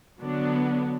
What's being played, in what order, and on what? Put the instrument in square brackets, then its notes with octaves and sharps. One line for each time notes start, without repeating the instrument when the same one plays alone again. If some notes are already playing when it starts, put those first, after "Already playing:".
[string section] D3 F#3 B3 D4